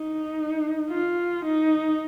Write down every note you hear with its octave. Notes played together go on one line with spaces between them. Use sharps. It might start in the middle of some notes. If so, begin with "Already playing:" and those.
Already playing: D#4
F4
D#4